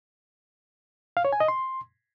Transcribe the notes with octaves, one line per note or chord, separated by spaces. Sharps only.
F5
C#5
G#5
D#5
C6